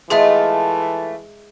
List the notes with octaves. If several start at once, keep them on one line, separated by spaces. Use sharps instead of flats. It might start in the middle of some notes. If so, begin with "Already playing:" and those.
E3 G#3 A3 F4 G#4 E5